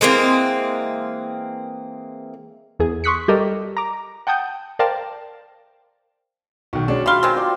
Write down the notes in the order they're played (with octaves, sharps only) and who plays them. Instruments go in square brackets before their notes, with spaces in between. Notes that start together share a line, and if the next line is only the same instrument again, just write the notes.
[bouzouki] E3 G#3 A#3 C4
[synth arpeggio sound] E2 G#4
C6 C#6 D#6 F#6 B6 C#7
G3 G4 A4 A#4 D5 D#5
A#5 D6
F#5 G5 A5 D#6 G6
A#4 C5 D5 F5 G5 A5
[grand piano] B1 D#3 [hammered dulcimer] F#4
[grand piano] G#3 C#4 D4 [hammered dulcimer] A5
[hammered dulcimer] F4 A5 [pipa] G4 F5 [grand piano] B5 C6 G7
[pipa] D#3 G#3 C4
[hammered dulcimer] F4 G4 D5